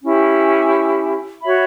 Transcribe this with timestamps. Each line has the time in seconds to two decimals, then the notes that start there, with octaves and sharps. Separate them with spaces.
0.02 C#4 E4 G4
1.41 F#4 C#5 E5 B5